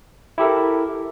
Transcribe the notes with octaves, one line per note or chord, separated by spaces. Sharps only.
E4 G4 A4 A#4